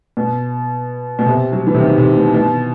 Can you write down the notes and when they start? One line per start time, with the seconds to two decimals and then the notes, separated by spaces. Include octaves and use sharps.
0.17 B2
1.19 B2
1.26 C3
1.52 F#3
1.67 E3
1.74 C3
1.80 D#3
1.98 C3
2.17 B2
2.34 B2